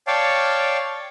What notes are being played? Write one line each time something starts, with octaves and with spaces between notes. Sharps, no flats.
C#5 D5 F5 G5 A5